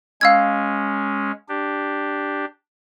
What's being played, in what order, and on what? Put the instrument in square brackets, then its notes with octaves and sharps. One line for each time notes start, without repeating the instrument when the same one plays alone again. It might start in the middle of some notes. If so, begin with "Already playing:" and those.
[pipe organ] G#3 C#4 [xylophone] F5 E6 G#6
[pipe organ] D4 G4